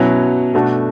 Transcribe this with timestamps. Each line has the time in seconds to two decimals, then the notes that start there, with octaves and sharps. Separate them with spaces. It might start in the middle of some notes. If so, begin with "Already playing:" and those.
Already playing: B2 F#3 C#4 E4
0.54 B2 A3 D4 F#4 A4